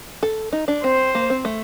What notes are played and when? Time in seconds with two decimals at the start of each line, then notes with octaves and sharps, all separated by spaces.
0.23 A4
0.53 D#4
0.68 D4
0.83 C4 C5
1.15 A#3
1.30 C4
1.45 A3